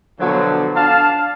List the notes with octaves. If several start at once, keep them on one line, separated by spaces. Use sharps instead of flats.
B2 D3 F3 F#3
D4 F5 A5